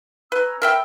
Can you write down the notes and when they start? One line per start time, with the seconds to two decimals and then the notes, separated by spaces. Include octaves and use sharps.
0.32 C#4 B4 A#5 E6
0.62 A#4 E5 G5 B5 E6